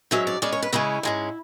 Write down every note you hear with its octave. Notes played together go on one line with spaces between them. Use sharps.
G#2 F#3 C#4 E5
D5
C#3 G#3 C#4 D5
C#5
B4
C#3 G#3 C#4 E4
G#2 G#3 C#4